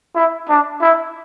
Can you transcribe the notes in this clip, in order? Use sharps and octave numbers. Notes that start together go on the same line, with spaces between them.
E4
D4
E4